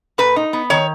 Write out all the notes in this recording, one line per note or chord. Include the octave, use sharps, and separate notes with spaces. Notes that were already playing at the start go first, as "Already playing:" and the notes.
A#2 B4
D#4
B3
D#3 C#5